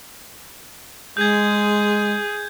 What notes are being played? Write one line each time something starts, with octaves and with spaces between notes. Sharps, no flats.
G#3 G#4 G6 G#6